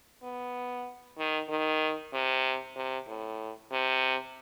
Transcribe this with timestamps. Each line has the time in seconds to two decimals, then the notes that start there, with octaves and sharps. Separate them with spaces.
0.22 B3
1.18 D#3
1.49 D#3
2.13 C3
2.76 C3
3.07 A2
3.72 C3